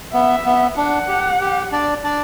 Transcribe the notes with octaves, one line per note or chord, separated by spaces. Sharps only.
B3 E5
B3
D4 F#5
G4
G4
D4 D5
D4 D5